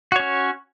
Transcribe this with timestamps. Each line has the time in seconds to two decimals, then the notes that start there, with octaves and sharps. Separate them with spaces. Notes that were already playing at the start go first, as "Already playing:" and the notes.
0.12 F#4
0.16 C#5
0.20 C#4